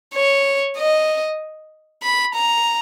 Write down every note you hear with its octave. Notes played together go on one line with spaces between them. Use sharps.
C#5
D#5
B5
A#5